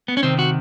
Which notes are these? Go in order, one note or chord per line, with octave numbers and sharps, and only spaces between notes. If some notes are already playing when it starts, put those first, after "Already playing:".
B3
C#4
C3 D#3 C4
F#4